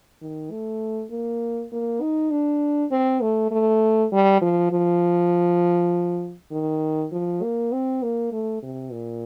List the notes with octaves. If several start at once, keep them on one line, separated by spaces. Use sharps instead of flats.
D#3
A3
A#3
A#3
D#4
D4
C4
A3
A3
G3
F3
F3
D#3
F3
A#3
C4
A#3
A3
C3
A#2